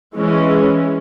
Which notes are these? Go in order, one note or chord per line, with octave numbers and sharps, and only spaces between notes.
E3 G#3 C#4